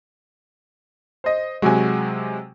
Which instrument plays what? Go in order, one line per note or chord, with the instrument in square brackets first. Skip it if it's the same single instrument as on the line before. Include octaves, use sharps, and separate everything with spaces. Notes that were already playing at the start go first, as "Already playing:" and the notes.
[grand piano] C5 D#5
[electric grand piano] C3 F#3 G#3 [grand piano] F#4 G#5